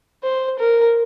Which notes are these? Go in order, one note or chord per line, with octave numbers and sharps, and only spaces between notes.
C5
A#4